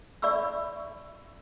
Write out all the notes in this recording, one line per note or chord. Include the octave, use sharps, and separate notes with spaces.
D5 E5 B5 C#6 E6